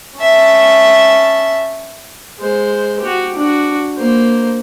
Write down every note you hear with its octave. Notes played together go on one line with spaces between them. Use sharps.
C#4 E5 A5
G#3 C5
F#4 G4
D4 F#4
A#3 C5